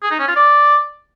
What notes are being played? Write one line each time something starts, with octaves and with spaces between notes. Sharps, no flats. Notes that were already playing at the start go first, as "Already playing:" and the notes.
G#4
D#4
C#4
F4
D5